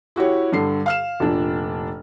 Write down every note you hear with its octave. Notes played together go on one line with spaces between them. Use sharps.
E4 F#4 G4 C#5
G2 D3 C7
F5 F6 E7
F1 A#2 D4